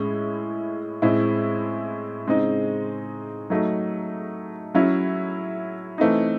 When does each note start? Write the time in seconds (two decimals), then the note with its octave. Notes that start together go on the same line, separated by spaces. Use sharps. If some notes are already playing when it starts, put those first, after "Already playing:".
Already playing: A2 G#3 C#4 E4
1.02 A2 G#3 C4 E4
2.27 C#3 G#3 C4 D#4
3.50 F#3 A3 D#4
4.74 F#3 C#4 E4
5.98 E3 A3 C4 D#4